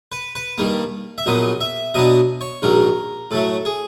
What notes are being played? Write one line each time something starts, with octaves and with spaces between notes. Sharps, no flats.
B4
B4
G2 D#3 G3 A#3
E5
A#1 A#2 F#3 B3 D#5
E5
B2 F#3 B3 D4 D#5
C#5
A#1 G#2 D#3 F#3 A#4
A2 F#3 A3 A4
G#4